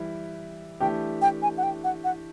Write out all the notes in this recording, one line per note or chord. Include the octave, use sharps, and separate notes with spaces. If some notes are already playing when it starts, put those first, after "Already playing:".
Already playing: E3 G3 E4
E3 A3 D4 G4 G5
G5
G#5
F#5
G5
F#5
F#5